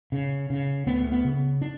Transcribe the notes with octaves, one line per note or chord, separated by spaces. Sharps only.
C#3
C#3
D2 B3
B3
C#3
D4